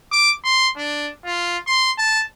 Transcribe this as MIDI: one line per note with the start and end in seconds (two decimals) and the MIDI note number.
0.12 0.31 86
0.44 0.69 84
0.77 1.10 62
1.25 1.58 65
1.67 1.91 84
1.98 2.23 81